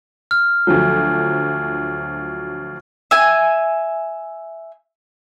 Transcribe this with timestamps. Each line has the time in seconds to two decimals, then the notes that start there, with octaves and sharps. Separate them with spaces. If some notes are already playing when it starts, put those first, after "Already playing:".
0.31 F6
0.67 D2 F3 F#3
3.11 E5 G#5